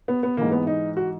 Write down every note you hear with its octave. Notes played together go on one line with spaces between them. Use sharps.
B3
B3
G#2 E3 A#3
B3
D#4
F#4